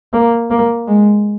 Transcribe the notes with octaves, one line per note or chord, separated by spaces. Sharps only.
A#3
A#3
G#3